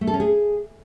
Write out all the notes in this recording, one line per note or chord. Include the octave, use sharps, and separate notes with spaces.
A3
A4
C#4
G#4